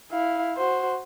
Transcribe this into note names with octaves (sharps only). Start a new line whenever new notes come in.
E4 F5
F#4 C5